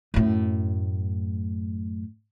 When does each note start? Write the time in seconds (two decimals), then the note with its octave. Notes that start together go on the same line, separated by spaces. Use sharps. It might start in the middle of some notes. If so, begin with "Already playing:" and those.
0.14 F#2 A2